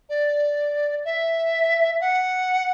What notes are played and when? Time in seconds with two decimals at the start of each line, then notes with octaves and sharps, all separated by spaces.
0.09 D5
1.05 E5
2.01 F#5